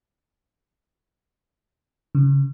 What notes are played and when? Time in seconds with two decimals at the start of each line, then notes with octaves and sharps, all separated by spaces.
2.15 C#3